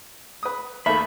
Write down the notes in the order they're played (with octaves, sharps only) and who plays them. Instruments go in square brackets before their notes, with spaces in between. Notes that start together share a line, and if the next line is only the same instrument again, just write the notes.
[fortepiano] B4 D#6
[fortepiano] D#2 A3 [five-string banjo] E5 [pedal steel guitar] B5